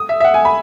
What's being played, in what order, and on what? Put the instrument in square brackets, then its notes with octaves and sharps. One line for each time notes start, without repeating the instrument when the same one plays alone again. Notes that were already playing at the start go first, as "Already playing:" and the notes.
Already playing: [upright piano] D#6
E5
E5
F#5
G#5
B5